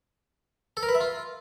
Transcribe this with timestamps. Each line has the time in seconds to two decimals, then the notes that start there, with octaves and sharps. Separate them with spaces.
0.77 A4
0.83 A#4
0.89 B4
0.95 E5
1.00 F4